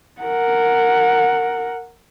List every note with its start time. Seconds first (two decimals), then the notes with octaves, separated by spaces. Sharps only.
0.22 A#4 F#5